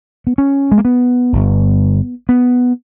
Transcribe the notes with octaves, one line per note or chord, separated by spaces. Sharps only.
B3
C#4
G#3
A#3
B3
G1 G2
B3